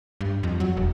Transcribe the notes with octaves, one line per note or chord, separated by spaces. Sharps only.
G2
F2
F#3
E1